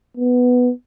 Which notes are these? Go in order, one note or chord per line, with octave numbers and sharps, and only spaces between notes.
B3